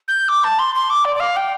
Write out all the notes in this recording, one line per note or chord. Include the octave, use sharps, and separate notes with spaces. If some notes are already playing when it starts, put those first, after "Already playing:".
G6
D6
A5
C6
C6
D6
D5
D5
F5
G5